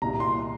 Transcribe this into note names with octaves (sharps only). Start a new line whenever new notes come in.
C2 A#2 A#5
C6
C6